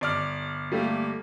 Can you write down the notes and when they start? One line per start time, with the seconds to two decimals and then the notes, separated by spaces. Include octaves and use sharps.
0.01 G1 D5 F6
0.72 G3 A3 A#3